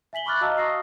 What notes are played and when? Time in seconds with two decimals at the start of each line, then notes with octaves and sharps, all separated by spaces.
0.13 E5 G#5 B6 F#7 G7
0.26 B5 C#6 D6 F6 F#6 A6
0.41 F#4 D#5 F5 A5 A#5 E6
0.58 C#6 D#6 A#6 C7